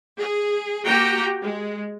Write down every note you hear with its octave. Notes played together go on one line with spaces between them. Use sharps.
G#4
A#3 F#4 G4 G5 A#5
G#3